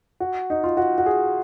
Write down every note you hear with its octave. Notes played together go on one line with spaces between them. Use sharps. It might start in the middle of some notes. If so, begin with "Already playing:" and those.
F#4
D#4
F4
F#4
F#4
G#4